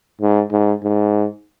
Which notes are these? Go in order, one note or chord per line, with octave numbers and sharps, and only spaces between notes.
G#2
G#2
G#2